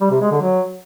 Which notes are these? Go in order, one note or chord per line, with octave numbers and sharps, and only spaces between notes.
G3
C3
G#3
D3
F#3